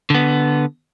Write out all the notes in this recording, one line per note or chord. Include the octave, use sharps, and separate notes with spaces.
D3 B3